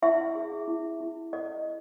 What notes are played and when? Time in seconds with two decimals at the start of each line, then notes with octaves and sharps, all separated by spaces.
0.02 E4 E5
0.35 G#4
0.68 E4
1.01 E4
1.33 A4 D#5